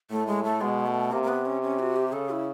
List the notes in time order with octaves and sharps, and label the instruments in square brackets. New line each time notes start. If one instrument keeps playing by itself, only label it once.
[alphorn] A2 [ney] A3
[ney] G#3
A3
[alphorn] B2 [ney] G#3
[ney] A3
[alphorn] C3 [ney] A#3
[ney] A#3
B3
C#4
C#4
F#4
G4
[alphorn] C#3 [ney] A4
[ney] E4